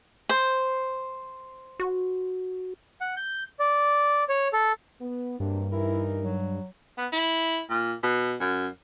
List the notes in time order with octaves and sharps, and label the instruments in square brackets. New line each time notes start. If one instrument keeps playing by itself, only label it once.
[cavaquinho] C5
[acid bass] F#4
[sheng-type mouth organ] F#5
G6
D5
C#5
A4
[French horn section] B3
[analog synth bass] G2 [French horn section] C3 F#3 A#3 [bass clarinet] D4
[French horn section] E3 D#4 A#4 [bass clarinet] E4
[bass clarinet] F#3
[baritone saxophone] B3
E4
A#2
B2
F#2